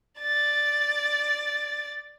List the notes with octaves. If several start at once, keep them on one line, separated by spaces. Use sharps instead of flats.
D5 A6